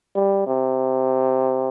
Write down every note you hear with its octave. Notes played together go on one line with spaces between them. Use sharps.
G3
C3